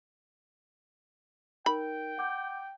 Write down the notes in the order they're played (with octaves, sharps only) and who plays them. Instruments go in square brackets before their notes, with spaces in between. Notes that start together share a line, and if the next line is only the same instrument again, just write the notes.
[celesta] D#4 A#4 [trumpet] G5 [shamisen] B5
[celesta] F#5 D6 G6